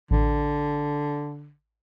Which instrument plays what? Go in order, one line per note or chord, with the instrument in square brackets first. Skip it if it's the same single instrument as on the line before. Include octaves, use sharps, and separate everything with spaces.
[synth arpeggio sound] A1 [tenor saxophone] D3